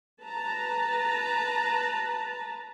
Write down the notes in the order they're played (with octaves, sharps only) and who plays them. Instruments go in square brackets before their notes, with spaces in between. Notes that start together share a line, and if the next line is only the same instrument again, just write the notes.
[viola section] B4 A5 A#5